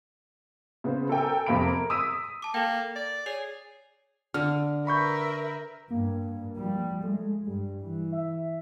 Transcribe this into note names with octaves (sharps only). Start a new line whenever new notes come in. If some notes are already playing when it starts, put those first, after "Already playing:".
C#3 B3 C5
A4 A#4 G5 G#5
F2 C3 F5 B5 D7
A#4
D#6 E6 B6 D#7
A5 D6
A#3 A4 G5
D5
G#4 C#5 C7 F7
D3 F6
A#4 B4 E5 B5 C#6 G6
G2 A#3
F3 G3
G#3 A3
G2 G3
E3
E5